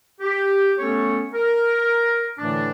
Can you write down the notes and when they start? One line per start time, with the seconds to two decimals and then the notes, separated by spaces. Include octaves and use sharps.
0.21 G4
0.78 A3 B3 C#4 A4 C#5
1.34 A#4
2.38 A2 D3 E3 A3 D4